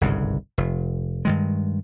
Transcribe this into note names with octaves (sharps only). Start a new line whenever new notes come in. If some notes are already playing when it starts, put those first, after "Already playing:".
G1 C2 G#2 C#3
F1
G2 D#3 G#3